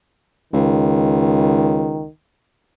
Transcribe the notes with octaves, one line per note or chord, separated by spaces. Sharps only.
C#2 D#3